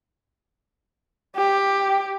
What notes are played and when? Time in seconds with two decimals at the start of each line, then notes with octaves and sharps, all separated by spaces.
1.36 G4